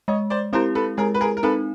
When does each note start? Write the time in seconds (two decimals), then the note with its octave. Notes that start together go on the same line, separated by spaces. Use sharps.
0.08 G#3 C#5 D#5
0.30 C5 D5
0.53 C4 E4 G4 A#4 C5
0.75 A4 B4
0.97 G#3 G#4 A#4
1.14 B4
1.21 G#4 A#4
1.37 A#4
1.43 C4 D#4 A4 B4